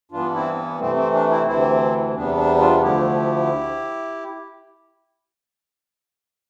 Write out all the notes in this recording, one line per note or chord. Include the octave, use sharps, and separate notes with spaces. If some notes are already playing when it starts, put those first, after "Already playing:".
G2 E3 B3 D4 F4
C4 E4
C3 E3 A3 C4
C4
D4
C4 E4
D2 C3 E3 C4 E4
E2 C3 G3 B3 D4
D4
D4 F4
D2 D3 F3 A3 E4 G4